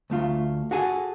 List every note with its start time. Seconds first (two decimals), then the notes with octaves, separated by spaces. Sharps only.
0.10 D2 A3 F4
0.71 F#4 G#4 A4 G#5